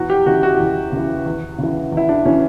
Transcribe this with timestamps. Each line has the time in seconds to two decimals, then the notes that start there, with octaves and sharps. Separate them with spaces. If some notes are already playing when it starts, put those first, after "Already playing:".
Already playing: E2 F#4
0.10 G4
0.26 C#3 E3 F#4
0.43 F#4
0.60 E2
0.92 C#3
0.97 E3
1.26 E2
1.58 C#3 E3
1.92 E2
1.97 E4
2.09 D4
2.25 C#3 E3 C#4